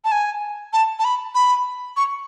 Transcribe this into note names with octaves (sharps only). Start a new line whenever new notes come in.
A5
G#5
A5
A5
B5
B5
C#6